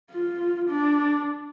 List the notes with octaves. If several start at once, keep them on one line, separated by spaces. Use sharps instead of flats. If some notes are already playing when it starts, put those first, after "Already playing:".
F4
D4